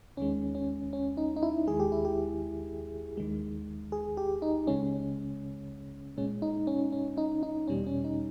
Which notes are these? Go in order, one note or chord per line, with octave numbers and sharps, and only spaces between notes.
D#2 D#3 G#3 C#4
C#4
C#4
D#4
D#4
E4
D#2 D#3 G#3 G#4
G4
E4
G4
D#2 D#3 G#3
G#4
G4
D#4
C#2 C#3 G#3 C#4
A#2 G#3 C#4
D#4
C#4
C#4
D#4
D#4
E2 B2 G3 C#4
C#4
D#4